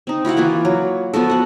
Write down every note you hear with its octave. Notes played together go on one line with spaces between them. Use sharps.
C4 D#4
E4 F#4 F5 F#5
E3 A#3 F4 B4
F#3
F3 B3 F#4 A4
F#4 F#5